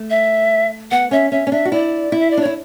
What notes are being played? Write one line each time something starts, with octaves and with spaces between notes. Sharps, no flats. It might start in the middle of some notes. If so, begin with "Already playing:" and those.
Already playing: A3
E5
B3 F#5
C#4 E5
C#4 E5
C#4
D4 E5
F#4
E4 D5
E4
E5
D5
D4
E4 C#5